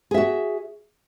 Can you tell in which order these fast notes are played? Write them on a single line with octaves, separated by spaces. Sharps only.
G#4 E5 F#4